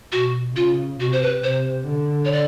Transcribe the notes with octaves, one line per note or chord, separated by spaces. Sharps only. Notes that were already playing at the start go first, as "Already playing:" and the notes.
B2 F#4
C#3 F4
C3 F#4
C5
B4
C3 C5
D3
C#5
D5